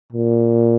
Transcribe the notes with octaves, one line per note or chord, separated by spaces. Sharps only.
A#2